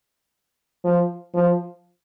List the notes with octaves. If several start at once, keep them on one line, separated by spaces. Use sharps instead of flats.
F3
F3